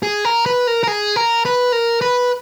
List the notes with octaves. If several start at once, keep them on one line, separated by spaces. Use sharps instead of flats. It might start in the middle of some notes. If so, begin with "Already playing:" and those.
G#4
A#4
B4
A#4
A#4
G#4
A#4
B4
A#4
B4